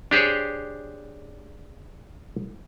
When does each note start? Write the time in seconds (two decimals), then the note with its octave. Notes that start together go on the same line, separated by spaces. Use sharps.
0.11 D4 G4 G#4 C5 C#5